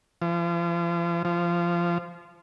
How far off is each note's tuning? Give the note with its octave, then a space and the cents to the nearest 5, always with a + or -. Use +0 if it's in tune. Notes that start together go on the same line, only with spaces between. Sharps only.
F3 -40
F3 -20